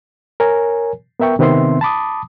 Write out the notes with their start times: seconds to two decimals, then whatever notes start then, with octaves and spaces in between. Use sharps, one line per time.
0.40 A#4 C#5 G#5
1.20 B3 A#4 E5 G5 C#6
1.39 C3 D#3 B3 C4 E5 C6
1.81 A5 B5 D6 D#6